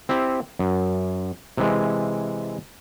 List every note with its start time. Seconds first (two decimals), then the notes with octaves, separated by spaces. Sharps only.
0.09 C4 E4 G4
0.59 F#2
1.57 C3 E3 G#3